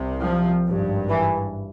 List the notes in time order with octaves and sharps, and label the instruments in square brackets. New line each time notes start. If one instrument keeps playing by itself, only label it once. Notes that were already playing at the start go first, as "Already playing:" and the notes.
Already playing: [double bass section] C2 C3
F3
G#1 G2
E3